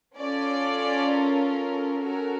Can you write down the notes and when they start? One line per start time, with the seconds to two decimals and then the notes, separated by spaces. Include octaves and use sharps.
0.17 C#4 F4 A4 D5
1.10 A#4
2.02 C#4 F#4 A4 A#4